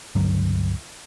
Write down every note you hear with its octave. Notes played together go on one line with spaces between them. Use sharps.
C#2 G2 D3 F#3